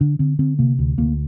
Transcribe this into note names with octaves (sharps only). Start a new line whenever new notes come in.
D3 D4
D3 C4
D3 C4
C3 A#3
D2
D2 A#3